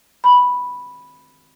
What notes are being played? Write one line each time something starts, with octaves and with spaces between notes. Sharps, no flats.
B5